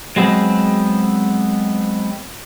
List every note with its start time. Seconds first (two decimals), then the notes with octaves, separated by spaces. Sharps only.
0.16 F#3 G#3 B3 C4